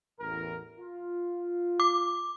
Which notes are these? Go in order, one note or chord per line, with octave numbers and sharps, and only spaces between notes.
A1 E2 A#4
F4
D6